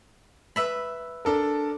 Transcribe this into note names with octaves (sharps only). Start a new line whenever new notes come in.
B4 E5 B5
D4 A4 A#4